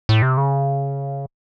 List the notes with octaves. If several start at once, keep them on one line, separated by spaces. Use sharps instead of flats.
A2
C3
C#3